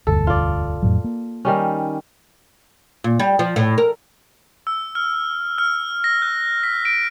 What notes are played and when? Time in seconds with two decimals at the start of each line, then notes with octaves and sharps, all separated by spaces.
0.07 E1 D2 G2 A4
0.27 F4 D5
0.83 F2 A2 F#3
1.04 A#3
1.45 D#3 G3 C#4
3.04 A#2
3.19 G3
3.39 F3
3.56 A2
3.78 A#4
4.67 E6
4.95 F6
5.58 F6
6.04 A#6
6.22 F#6
6.63 B6
6.85 D7